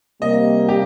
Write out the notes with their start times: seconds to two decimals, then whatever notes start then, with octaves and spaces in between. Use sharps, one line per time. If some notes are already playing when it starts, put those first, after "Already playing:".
0.21 C3 G3 A#3 D#5
0.69 G4